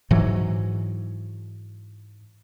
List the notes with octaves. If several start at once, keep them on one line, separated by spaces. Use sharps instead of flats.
G#2 E3 F#3